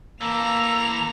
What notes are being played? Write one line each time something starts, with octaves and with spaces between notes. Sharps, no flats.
E3 A#3 A4 A#5 E6 F7